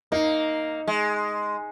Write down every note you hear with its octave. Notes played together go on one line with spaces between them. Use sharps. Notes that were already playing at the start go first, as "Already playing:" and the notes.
A#3 D#4
G#3